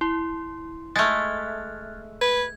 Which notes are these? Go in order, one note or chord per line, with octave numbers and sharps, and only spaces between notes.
E4 C6
G#3 A3 F6 F#6 G#6 A6
B4 G#6